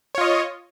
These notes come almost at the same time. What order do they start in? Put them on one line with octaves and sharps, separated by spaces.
C#5 F4 D#5